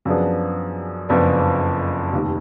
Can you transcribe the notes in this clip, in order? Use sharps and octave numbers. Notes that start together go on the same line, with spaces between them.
F#2 F3 B3 D4 G#4
F#1 F2 F3 B3 D4
F1 D#2 D#3